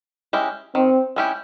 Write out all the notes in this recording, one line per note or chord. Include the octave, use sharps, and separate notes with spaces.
G#3 C#4 E4 G4
D#3 C4
G#3 C#4 E4 G4